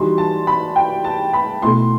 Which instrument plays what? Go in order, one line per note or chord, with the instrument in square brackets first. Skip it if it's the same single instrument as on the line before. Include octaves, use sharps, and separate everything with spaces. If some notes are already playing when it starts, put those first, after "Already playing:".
Already playing: [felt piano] E3 G3 D#4 F#4 [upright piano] C6
[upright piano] A5
B5
G5
A5
B5
[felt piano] B2 A3 E4 [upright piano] C6